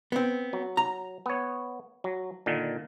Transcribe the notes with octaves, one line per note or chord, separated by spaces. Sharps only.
B3 C4
F#3
A#5
B3 C#5
F#3
A#2 D3 D#3